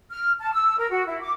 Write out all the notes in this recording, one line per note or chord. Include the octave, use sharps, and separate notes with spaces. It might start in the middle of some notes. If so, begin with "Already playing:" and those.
F6
A5
E6
A#4
F#4
E4
D6